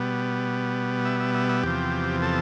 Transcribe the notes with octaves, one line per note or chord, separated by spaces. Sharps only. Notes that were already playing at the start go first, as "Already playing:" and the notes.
Already playing: B2 G3 B3
E5
E5
E5
E5
E2 C3 F3 G4
A4